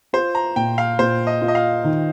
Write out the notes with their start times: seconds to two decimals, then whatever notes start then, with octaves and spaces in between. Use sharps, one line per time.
0.13 F4 C5
0.35 A#5
0.56 A#2 G5
0.78 F5
0.99 A#2 C5
1.27 D#5
1.42 F4
1.48 D#5
1.55 F5
1.84 D#3